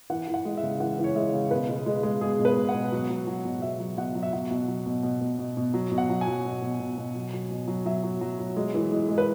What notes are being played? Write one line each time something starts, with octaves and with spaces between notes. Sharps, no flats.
E3 F#5
E3
F#5
G#3
E5
C#3
E3 F#5
E3
C#5
G#3 E5
C#3
B2 B4
G#3
G#3
G#3
B2 G#4
B2
B4
B2
F#5
B2
F#3
F#3
F#3
B2
F#3 E5
F#3
B2 F#5
F#3
E5
F#3 F#5
B2
F#3
B2
B2
B2
B2
B2
F#3
B2
F#5
F#3
G#5
F#3
B2
B2
B2
B2
F#3
F#3
B2
F#3
F#3 E5
F#3
F#3
F#3
G#3
E3
G#3
G#3
B4